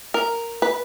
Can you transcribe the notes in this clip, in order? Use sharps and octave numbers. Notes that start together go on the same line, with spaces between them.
A#4
B4